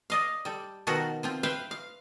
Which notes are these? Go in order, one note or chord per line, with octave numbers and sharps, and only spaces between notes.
D5 D#5 F5
G3 A4
B2 D#3 F3 F#4 A4 A#4
F3 C4 F4
B4 C5 E5 F5 G5
F5